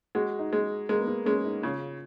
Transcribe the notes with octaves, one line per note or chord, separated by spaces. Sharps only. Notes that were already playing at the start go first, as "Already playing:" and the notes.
G#3 F#4
D#4
G#3
G#3 A#3
B3
A#3
G#3 C#4
D#4
C#3 F4